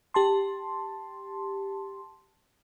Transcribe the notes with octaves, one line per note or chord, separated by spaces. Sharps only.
G4 A5 C6